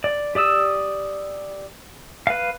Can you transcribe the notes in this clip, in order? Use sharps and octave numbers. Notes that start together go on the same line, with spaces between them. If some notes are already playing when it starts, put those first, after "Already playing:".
D5
G4 D5 D#6 E6
B4 F5